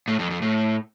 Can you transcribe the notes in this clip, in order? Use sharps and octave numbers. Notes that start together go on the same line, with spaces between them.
A2
F2
F2
A2